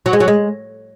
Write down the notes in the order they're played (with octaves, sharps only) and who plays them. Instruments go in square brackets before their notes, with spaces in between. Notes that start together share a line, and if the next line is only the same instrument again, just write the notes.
[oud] F#3
G#3
F#3
G#3